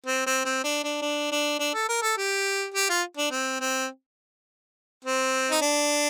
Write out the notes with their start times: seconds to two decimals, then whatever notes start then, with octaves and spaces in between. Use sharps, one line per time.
0.06 C4
0.26 C4
0.45 C4
0.64 D4
0.84 D4
1.02 D4
1.31 D4
1.59 D4
1.74 A4
1.89 A#4
2.02 A4
2.17 G4
2.74 G4
2.89 F4
3.17 D4
3.31 C4
3.60 C4
5.05 C4
5.51 D#4
5.61 D4